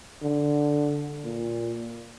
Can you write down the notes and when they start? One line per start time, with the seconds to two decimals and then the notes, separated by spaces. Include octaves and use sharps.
0.23 D3
1.24 A#2